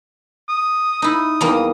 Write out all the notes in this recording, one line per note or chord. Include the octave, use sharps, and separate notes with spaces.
D#6
D#4 E4 D#6
E2 G3 A#3